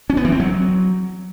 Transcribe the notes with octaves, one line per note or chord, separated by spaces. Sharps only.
C#4
B3
E3
C4
F#3